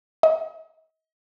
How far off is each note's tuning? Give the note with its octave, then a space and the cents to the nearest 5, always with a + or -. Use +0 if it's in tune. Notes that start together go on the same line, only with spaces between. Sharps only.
D#5 +40